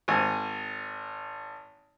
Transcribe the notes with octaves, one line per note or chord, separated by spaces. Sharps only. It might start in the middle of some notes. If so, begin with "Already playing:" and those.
G#1 G#5